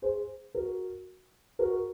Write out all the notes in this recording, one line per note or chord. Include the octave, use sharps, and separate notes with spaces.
G#4 C5
F#4 A#4
F#4 A#4